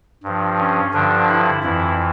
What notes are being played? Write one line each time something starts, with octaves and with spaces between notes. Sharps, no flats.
G2 F3
C#4
G2 D3 F3 D4
E4
F2 E3 E4